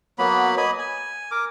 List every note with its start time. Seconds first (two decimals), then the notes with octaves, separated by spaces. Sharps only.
0.19 F#3 A#3 B3 B5
0.57 D#5 G#5 B5
0.79 G#5
1.31 A#4 D6